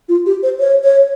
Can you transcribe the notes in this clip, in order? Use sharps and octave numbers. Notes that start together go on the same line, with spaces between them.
F4
G4
C5
C#5
C#5